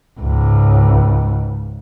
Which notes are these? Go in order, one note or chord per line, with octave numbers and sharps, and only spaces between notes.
C#2 G#2